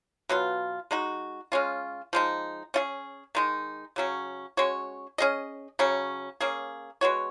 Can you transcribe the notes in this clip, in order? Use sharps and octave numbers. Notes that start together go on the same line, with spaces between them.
B2 F#3 B3 F4
G#3 D#4 F#4
G#3 C#4 F4
F3 G#3 D#4
C#4 F4 G#4
D#3 G#3 D#4
C#3 F#3 C#4
G#3 C#4 F#4 C#5
C#4 G#4 D#5
C#3 F#3 C#4
A#3 C#4 G#4
G#3 B3 F#4 C#5